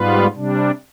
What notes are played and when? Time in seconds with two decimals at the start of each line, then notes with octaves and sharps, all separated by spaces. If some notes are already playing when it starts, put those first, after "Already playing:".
Already playing: G#2 G3 B3 F4 B4
0.35 C3 G3 D4